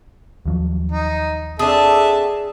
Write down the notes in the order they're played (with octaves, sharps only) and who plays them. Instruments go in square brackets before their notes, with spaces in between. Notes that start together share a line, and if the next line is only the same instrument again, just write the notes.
[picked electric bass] D#2 F3 F#3
[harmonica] D#4
[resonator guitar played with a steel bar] C4 D4 [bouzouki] G#4 [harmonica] A4 E5 A5